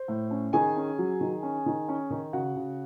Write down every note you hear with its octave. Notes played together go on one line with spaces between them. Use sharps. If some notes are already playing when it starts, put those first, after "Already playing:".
Already playing: C5
A2
C#4
D#3 G#4 G#5
C#4
F#3
D#3
C#4
D#3
C#4
D#3
C#3 F#4 F#5
C#3